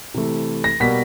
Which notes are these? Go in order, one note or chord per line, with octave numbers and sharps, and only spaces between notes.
C3 E3 A3
A#6
B2 G3 A#3 B6